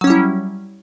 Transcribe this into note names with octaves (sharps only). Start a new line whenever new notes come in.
F#3 G3 C#4 E4